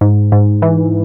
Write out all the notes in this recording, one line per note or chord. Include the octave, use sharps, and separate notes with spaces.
G#2
G#2
E3